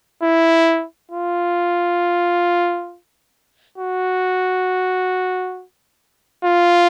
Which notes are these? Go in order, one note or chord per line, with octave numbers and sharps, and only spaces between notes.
E4
F4
F#4
F4